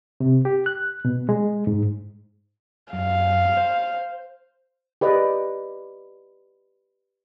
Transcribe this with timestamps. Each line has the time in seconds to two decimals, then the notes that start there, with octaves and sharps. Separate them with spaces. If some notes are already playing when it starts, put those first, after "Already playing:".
0.20 C3
0.45 G4
0.66 F#6
1.05 B2
1.29 G#3
1.67 G#2
2.93 F#2 F5
3.57 C5
5.01 G4 B4 D5 D#5